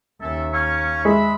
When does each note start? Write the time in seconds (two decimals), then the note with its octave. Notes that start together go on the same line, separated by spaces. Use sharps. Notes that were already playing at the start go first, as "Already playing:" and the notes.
0.21 D#2 D#3 C#4 A4 E5
0.54 C#4 F5 C#6
1.05 G#3 E5 B5